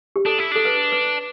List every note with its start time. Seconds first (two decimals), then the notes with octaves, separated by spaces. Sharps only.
0.16 G4
0.26 D4 A4
0.39 E4
0.52 D4 A4
0.65 B4
0.92 B4